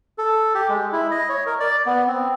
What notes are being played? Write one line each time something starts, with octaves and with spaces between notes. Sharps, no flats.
A4
G4
G#3
E4
D#5
C#5
A#4
D5
B3
C4